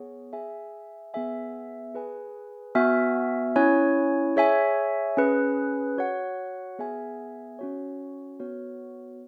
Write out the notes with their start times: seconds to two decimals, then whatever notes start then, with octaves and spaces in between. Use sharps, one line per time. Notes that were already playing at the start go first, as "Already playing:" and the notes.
Already playing: B3 G#4 C#5
0.33 G#4 E5 G#5
1.14 B3 G#4 E5 G#5
1.94 G#4 B4 G#5
2.75 B3 F#4 E5 G#5
3.56 C#4 E4 C#5 G#5
4.36 G#4 C#5 E5 G#5
5.17 C#4 G#4 B4
5.98 F#4 C#5 F#5
6.78 B3 G#4 E5 G#5
7.59 C#4 F#4 C#5
8.40 B3 F#4 C#5